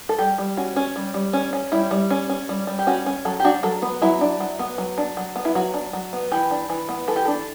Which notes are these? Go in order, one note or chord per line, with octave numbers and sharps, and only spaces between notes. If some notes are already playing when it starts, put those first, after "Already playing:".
A4
G3 G4
G3
C#4 F#4
C#4
G3
G3
C#4
C#4
G3 E4
G3
C#4
C#4
G3
G3
G4
C#4 F#4
C#4
F#3 A4
G4
D4 F#4
F#3 A4
B3 B4
F#3 E4
D4
F#3
B3
F#3
D4
F#3
B3
E4
F#3 F#4
D4
F#3
B3
E3 G4
D4
E3
B3
E3 A4
G4
D4 A4